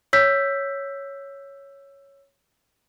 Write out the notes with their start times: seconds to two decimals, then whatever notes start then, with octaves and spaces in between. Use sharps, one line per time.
0.13 C#5 E6 G6 B6